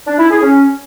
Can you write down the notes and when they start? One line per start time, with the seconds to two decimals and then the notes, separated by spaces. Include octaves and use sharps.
0.07 D4
0.19 E4
0.31 G#4
0.43 C#4